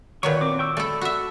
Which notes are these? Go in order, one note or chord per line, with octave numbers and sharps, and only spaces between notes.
A#2 D#3 F#3 B4 C#6
C4 D6
G5 C#6 E6
A3 A4 D5 A5 B5
F#4 E5